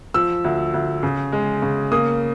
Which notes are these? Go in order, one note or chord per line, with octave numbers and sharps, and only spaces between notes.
F3 E6
D2
D2
C#3
G#3
C#3
A#3 D#6